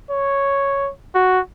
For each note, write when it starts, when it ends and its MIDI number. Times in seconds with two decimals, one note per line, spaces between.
0.10 0.91 73
1.15 1.40 66